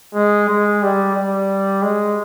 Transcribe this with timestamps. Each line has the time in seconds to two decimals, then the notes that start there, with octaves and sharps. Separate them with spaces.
0.14 G#3
0.49 G#3
0.83 G3
1.15 G3
1.83 G#3